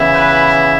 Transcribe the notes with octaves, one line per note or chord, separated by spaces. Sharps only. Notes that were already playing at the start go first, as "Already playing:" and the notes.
Already playing: C#3 E3 B3 E4
B4